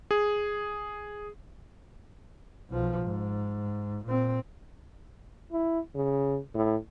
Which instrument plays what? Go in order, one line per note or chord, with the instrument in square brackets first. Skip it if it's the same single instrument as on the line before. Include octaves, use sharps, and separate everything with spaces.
[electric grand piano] G#4
[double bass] B1 F3
G#2
A#2 C4
[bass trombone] E4
C#3
A2